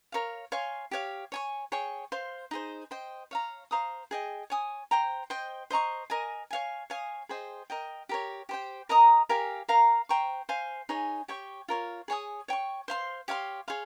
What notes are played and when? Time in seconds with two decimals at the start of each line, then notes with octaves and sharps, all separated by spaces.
0.12 A#4 C#5 F5
0.52 C#5 F5 G#5 C6
0.91 G4 C#5 F5
1.32 C#5 G#5 C#6
1.72 G#4 C#5 G5 C#6
2.12 C5 F5 C6
2.51 D#4 G#4 C5
2.91 C5 D#5 G5
3.31 C#5 F5 A#5
3.71 C5 F5 A#5 D#6
4.11 G#4 D#5 G5
4.50 C#5 G#5 D#6
4.91 C5 G5 A#5
5.30 C5 D#5 G5
5.71 C5 D#5 A#5 C#6
6.10 A#4 D#5 G#5
6.51 C#5 F5 G#5
6.90 C#5 F5 G#5 D#6
7.29 G#4 C5 D#5 G5
7.70 A#4 D#5 G5
8.09 G4 A#4 C#5
8.49 G4 C5 G5
8.89 A#4 D#5 A#5 D#6
9.29 G4 A#4 F5 G#5
9.69 A#4 F5 A#5
10.09 C5 G5 A#5 C#6
10.49 C5 F5 G#5
10.89 D#4 G#4 C#5 G#5
11.28 G4 C#5 G5 C#6
11.68 F4 A#4 C#5
12.08 G#4 C#5 G#5 D#6
12.48 C#5 G5 C#6
12.88 C5 F5 C6
13.28 G4 C#5 F5 C6
13.68 G#4 C#5 F5 C6